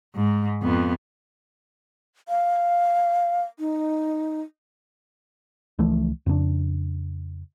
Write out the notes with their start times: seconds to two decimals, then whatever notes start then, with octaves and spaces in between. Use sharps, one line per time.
0.15 G#2
0.62 F2 B3
2.29 F5
3.59 D#4
5.79 C#2 E3 F3 A3
6.26 F2 C#3 A#3 D4